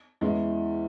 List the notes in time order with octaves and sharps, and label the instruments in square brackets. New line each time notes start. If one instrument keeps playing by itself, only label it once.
[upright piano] E2 E3 G#3 C#4 E4